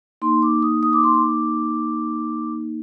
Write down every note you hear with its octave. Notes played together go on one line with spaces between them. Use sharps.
A#3 D#4 C6
D6
D#6
D#6
D6
C6
D6